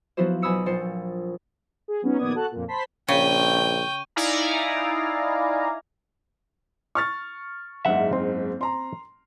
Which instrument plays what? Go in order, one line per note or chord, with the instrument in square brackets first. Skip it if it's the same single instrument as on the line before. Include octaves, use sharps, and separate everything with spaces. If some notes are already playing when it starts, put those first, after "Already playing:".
[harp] F3 F#3 B3 E4 F#4 C5
B1 G#5 B5 D#6 E6 C#7
A#1 F4 C5 C#7
[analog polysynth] G#4
F#3 B3 C#4 D#4
A#1 D#3 B3 D5 D#6 G#6
F#4 A4 A5 F#6
F2 A#2
C5 A5 B5 C6 B6
[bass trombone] A#1 [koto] C#3 [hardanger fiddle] G5 [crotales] C#6 G6 D#7
[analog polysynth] D#4 E4 D5 F5 G#5 A#5
[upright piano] C#6 F6 A6
[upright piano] F#1 G#2 [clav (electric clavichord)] E5 F#5
[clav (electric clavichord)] C4
[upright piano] A#5 C6